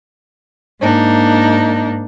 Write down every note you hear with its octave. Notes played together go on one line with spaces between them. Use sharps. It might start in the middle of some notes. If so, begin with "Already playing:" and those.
G#2 A#3 D4 D#4